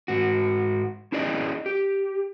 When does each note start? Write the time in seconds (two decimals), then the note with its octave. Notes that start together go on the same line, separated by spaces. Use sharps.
0.08 G#2 F#4
1.12 C#4 E4 G#4 D5 D#5
1.66 G4